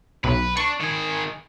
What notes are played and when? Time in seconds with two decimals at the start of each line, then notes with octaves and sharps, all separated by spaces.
0.24 B1 B4
0.57 D4 C#6
0.81 D#3 G#4